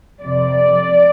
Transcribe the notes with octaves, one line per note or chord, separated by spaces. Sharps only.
F2 C3 D5